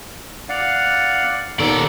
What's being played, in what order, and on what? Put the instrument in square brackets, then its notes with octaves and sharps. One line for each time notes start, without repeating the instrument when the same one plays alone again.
[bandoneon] D5 F5 F#5
[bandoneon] D#2 B3 A4 [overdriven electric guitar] D#3 D5